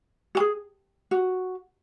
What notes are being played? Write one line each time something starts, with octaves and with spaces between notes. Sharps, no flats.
F#4
G#4
F#4